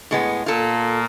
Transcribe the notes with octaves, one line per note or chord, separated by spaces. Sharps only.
A2 G#3 B3
A#2 A#3 F4 A4